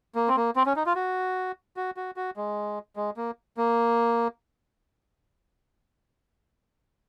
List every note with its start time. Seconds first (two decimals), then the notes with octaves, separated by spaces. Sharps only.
0.15 A#3
0.28 C4
0.37 A#3
0.56 C4
0.66 C#4
0.76 D#4
0.86 F4
0.96 F#4
1.77 F#4
1.97 F#4
2.17 F#4
2.37 G#3
2.96 G#3
3.17 A#3
3.57 A#3